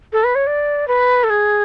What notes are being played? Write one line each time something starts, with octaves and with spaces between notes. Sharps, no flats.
A4
B4
C#5
D5
B4
A4
G#4